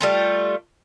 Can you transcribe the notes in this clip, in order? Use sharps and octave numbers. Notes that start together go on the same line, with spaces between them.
G3 A3 F4